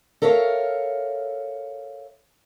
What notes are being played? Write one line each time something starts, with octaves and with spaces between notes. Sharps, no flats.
A4 A#4 C#5 E5 F5